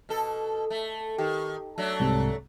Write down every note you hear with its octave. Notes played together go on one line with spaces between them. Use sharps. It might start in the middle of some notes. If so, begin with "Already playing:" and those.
B2 A4
A3
D#3 G4
F#3 A3 D4
C2 G#2 C3